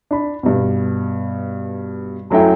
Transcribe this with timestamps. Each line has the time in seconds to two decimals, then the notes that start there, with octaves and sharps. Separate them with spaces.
0.11 D4 B5
0.43 G2 B2
2.30 F#2 F#3 A3 E4 G5